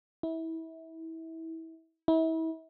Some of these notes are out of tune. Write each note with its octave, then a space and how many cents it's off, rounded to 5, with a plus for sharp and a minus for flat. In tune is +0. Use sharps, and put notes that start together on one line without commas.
E4 -25
E4 -35